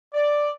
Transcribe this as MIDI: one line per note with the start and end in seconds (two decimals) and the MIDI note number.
0.14 0.49 74